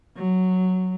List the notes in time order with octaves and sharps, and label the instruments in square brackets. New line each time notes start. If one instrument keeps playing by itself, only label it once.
[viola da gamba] F#3